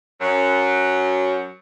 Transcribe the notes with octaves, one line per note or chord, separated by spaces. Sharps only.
F#2 F#3